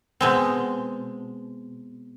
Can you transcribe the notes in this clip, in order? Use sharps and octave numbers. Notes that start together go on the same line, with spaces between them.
B2 G#3 C4